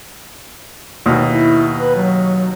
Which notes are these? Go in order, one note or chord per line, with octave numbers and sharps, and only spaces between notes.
D#2 B2
E4
B4
F#3